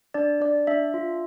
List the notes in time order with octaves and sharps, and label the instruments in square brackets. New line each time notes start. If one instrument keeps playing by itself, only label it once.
[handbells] D4 D5
D4 D5
D4 E5
F4